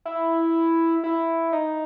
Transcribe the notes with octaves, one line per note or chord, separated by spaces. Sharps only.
E4
E4
D#4